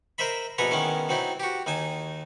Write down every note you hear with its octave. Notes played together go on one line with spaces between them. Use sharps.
A#4 C5 D#5 E5 B5
A#1 B2 A4 B4 G#5 A#5
D#3 G#3 B3 C#4 E4
F#3 C4 D#4 E4
F#4 G4
D#2 D#4 G#5 A5